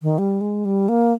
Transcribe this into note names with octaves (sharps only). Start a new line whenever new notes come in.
D#3
G3
G#3
G3
A#3